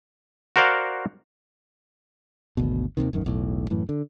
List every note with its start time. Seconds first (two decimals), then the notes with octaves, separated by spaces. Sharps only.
0.56 F#4 A#4 C5 D5 F5 F#5
2.57 G#1 D2 B2
2.97 D#2 G#2 C3 D#3
3.13 D1 F#2 D#3
3.25 E1 B1 A2
3.70 F#2 A2 E3
3.89 D3